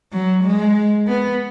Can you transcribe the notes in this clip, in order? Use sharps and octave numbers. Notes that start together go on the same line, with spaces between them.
F#3
G#3
B3